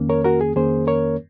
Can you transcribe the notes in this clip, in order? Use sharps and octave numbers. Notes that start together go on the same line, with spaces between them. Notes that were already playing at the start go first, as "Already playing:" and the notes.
Already playing: F2 D#3 A#3 C#4
A#4 C#5
F#4 A#4
G#4
F2 D#3 A#3 C#4 G#4 C5
A#4 C#5